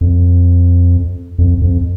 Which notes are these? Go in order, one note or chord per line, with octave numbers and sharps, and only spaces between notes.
F2
F2
F2